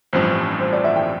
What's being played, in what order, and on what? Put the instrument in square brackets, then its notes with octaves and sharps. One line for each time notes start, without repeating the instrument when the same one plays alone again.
[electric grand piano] A1 G2 F3 C4 [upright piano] C5
[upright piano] C5
D5
E5
G5